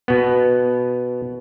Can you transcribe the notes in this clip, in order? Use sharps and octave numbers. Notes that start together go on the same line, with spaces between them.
B2 B3